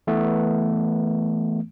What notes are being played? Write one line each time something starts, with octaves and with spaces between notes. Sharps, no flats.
E3 A3 B3